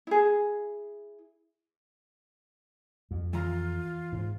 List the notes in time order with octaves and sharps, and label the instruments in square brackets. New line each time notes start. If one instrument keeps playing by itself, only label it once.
[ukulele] E4 G#4
[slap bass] F2
[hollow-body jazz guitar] E3 A#5 [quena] F4
[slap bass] G#2